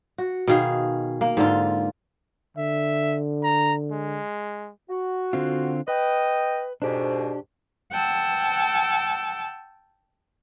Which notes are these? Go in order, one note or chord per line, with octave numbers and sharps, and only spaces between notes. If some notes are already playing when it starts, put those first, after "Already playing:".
F#4
B2 D#3 G#4 F5
A#3
G#2 D3 F4
D3 E5
A#5
G#3
F#4
D3 C4 F4
B4 D#5 G5
F2 G#2 B2 D4 G4
F#5 G5 A5 E6